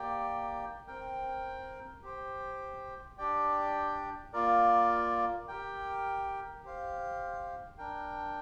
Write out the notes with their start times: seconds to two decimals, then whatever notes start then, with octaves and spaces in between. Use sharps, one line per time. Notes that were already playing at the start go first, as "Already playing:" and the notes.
Already playing: A#3 G4 D5 G5
0.87 C4 A#4 G5
2.03 G4 C5 G5
3.18 D4 G4 D5 G5
4.33 A#3 F4 A#4 D5
5.48 G4 A#4 G5
6.64 G4 C5 F5
7.78 D4 A#4 G5